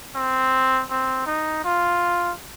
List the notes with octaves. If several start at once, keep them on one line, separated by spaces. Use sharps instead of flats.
C4
C4
D#4
F4